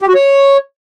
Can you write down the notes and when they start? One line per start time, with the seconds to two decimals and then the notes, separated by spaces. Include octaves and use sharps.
0.01 G4
0.08 F#4
0.15 C#5